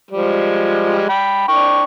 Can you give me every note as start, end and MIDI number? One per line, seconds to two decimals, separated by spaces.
0.11 1.07 53
0.11 1.07 55
0.11 1.07 56
1.09 1.46 79
1.09 1.46 83
1.48 1.84 62
1.48 1.84 79
1.48 1.84 85